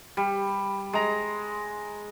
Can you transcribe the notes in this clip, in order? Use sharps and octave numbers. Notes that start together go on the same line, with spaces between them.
G3
G#3 A#5